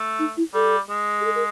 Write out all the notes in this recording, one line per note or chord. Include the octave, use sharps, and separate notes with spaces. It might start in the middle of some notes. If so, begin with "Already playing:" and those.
Already playing: A3
D#4
E4
G3 A4
G#3
G#4
A4
A#4